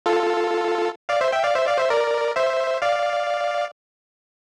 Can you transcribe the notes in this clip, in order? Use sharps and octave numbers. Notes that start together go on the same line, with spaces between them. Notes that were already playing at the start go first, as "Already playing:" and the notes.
F4 A4
D5 F5
C5 E5
E5 G5
D5 F5
C5 E5
D5 F5
C5 E5
A#4 D5
C5 E5
D5 F5